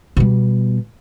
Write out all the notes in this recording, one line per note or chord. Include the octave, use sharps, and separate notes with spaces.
B2 G3